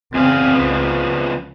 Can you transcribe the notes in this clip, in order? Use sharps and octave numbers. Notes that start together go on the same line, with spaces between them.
E2 C#3 C4 G#4 F5
C#2 C#3 F3 B3